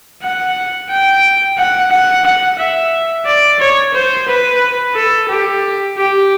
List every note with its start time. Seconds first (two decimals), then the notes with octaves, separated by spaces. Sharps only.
0.22 F#5
0.90 G5
1.58 F#5
1.91 F#5
2.24 F#5
2.59 E5
3.26 D5
3.60 C#5
3.94 C5
4.28 B4
4.95 A4
5.29 G4
5.97 G4